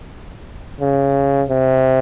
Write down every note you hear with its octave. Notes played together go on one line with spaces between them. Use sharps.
C#3
C3